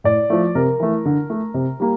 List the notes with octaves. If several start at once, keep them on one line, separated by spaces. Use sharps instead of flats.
A2 D5
F3 A3
C3 A#4
E3 A3
D3
A3
C3
G3 A#3